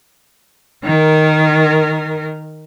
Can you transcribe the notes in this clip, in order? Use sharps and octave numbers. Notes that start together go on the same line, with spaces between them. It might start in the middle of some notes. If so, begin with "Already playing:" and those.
D#3 A#4